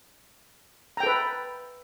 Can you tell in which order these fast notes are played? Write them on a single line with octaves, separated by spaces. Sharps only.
A#5 G5 A4 B4